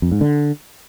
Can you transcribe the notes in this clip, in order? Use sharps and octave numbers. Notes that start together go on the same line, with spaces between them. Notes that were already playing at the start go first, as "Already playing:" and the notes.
F2
G#2
D3